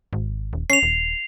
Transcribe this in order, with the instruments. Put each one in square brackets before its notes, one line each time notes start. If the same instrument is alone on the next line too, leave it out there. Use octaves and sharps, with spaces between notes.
[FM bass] G#1
D#1
[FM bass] C#4 [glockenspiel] C7 F7
[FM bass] D#1